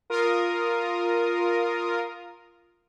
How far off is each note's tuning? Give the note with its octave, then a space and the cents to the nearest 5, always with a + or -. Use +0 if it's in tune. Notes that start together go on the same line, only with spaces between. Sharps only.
F4 +0 A#4 +0 D#6 +0